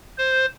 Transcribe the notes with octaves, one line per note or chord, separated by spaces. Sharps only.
C5